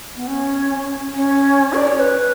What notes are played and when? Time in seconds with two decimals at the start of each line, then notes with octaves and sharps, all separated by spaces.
0.16 B3
0.27 C#4
1.14 C#4
1.74 D5
1.87 C#5
2.00 B4